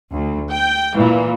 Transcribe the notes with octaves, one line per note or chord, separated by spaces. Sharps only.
D2
G5
A#2 E3